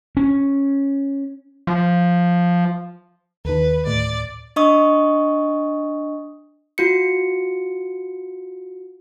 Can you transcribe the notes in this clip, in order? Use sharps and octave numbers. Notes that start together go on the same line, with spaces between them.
C#4
F3
D#2 D#3 B4
D2 A2 D5
D4 D#5 C#6 D#6
F4 F#4 C#7